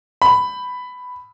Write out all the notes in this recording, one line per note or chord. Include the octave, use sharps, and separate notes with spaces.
B5